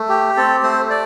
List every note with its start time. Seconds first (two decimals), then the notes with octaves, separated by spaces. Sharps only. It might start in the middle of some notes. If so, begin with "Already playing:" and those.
Already playing: A3
0.09 G4
0.36 C4 A4
0.63 A3 C5
0.90 D5